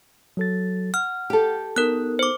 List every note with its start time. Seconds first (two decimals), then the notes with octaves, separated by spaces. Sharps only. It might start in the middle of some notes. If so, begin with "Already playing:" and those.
0.37 F#3 A4 A6
0.94 F#5 F6
1.30 G4 A4
1.76 B3 D#4 A#4 F#6
2.19 C5 D6